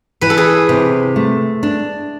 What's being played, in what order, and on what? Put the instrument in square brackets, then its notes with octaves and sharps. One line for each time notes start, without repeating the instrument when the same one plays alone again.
[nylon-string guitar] E3 [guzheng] B4
[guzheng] A4
G#4 B4
[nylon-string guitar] C3
A3
D4